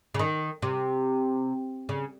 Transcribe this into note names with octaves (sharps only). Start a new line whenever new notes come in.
C#3
D#3
C3
C#3